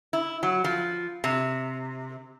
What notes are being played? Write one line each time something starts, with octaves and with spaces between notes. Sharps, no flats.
E4
F#3
F3
C3